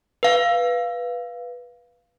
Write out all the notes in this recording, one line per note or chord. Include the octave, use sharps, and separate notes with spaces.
B4 F5